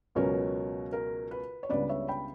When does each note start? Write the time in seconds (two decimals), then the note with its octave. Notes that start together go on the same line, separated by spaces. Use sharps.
0.15 C#2 B2 F#3 C#4 A#4 C#5
0.93 A#4
1.31 B4
1.63 C#5
1.69 C#2 C#3 G3 B3 D4 B4 D5
1.89 C#5 E5
2.09 G5 B5